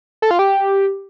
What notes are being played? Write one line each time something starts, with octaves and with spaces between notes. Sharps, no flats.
A4
F4
G4